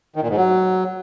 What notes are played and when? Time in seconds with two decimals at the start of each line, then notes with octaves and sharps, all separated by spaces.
0.16 D#3
0.23 A#2
0.30 G#2
0.37 F#3